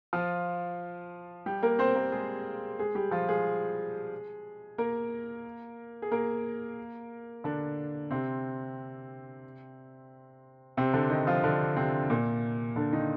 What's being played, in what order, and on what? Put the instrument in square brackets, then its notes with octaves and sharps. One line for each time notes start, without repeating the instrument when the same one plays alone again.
[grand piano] F3 F4
G3 G4
A#3 A#4
C4 C5
A#3 A#4
G#3 G#4
G#3 G#4
G3 G4
F3 F4
G#3 G#4
A#3 A#4
G#4
A#3 A#4
D3 D4
C3 C4
C3 C4
D3 D4
D#3 D#4
F3 F4
D3 D4
C3 C4
A#2 A#3
D3 D4
D#3 D#4